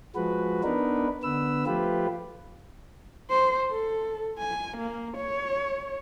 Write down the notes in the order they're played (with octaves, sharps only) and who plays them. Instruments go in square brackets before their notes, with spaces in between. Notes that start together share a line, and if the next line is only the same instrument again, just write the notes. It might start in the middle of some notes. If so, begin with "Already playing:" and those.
[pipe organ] F3 G#3 F#4 B4
B3 D4 D#4 A#4 B4
D3 B3 B4 E6
F3 A3 F4 G4 B4
[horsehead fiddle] C5
A4
G#5
A#3
C#5